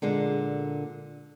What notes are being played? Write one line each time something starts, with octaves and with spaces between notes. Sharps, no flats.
A#2 D3 G#3